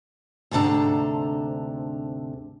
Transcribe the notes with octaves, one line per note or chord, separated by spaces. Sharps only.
D2 G#2 C3 D4 A4 A#5